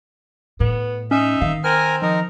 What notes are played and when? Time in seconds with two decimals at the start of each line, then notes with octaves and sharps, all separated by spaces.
0.60 A2 B3
1.11 C#4 D#4 E5
1.41 D#3 F5
1.64 C4 A#4 G#5 F6
2.02 F3 D#4 A#4